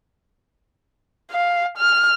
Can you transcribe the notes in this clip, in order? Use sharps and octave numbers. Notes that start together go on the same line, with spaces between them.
F5
F6